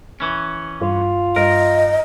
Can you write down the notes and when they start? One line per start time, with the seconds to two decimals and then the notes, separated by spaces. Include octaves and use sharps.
0.20 E3 C#4
0.81 G2 F4
1.36 G2 A#4 D#5